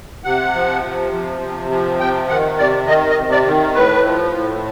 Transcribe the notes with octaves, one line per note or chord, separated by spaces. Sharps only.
C3 F#5
F3
C3
F3
C3
F3
C3 G5
D#3 F#5
C3 D5
D#3 D#5
D#5
C3
D5
D#3
A2 B4
F3
A2